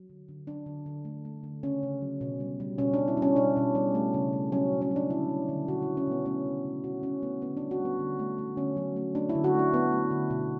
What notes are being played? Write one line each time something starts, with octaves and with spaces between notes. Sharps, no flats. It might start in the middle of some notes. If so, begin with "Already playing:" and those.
Already playing: F#3
D3
D3
F#3 D4
D3
D3
A3
A3
D3
C#3 C#4
C#3
F#3
B2
G3
G3
B2 C#4
D4
G3
E4
G3
C#4
B2 D4
B2
G3
A3
C#3
A3
F#3 C#4
B2
C#4
F#3
D4
D3 E4
G3
D3
B2 F#4
B2 E4
C#4
B2 B3
A3 C#4
C#3
C#3
B2 F#4
B2 C#4
A3 B3
D3 B3
G3 D4
F#4
G3
B3
D3
A3
A3
D3 C#4
F#3
A3
A3 D4
E4
D3
F#4
A3 D4
A3 B3
A3
D3
B2